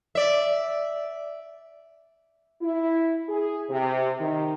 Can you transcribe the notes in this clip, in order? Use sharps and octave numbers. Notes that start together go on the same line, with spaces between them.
D5 E5
E4
G#4
C3
D#3